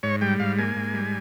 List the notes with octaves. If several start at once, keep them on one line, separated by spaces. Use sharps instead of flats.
G#2 C#5
G3 G5
G#2 F5
A#3 G#5
G#2
G3